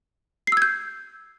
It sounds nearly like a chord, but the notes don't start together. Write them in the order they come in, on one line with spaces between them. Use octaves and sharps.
C7 E6 G#6 G6